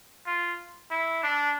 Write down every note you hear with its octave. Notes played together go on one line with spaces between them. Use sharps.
F4
E4
D4